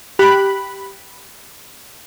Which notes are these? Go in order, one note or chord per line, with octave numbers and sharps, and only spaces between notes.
G4 B5 F#6